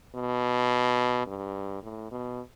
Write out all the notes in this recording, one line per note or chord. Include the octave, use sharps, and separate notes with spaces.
B2
G2
A2
B2